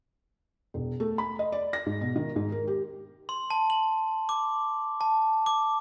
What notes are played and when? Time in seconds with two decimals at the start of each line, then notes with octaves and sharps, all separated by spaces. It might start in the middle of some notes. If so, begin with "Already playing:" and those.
0.74 E1
1.00 A3
1.18 B5
1.39 D#5
1.52 D5
1.73 A#6
1.86 G#2
2.01 B2
2.16 D#3
2.36 G#2
2.52 A#4
2.67 G4
3.29 C6
3.50 A5
3.70 F#7
4.29 D6
5.01 A5
5.46 D6